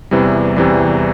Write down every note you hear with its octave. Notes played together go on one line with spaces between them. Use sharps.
E2 C3 E3 G3
E2 C3 E3 G3